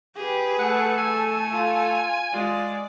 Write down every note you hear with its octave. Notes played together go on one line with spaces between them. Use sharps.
G4 G#4 B4
A3 A4 F#5
G#5
F4
G#3 F4 D5